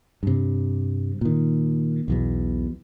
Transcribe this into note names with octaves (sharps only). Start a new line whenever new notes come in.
G2 C3
A#2 D#3
B1 E2 B2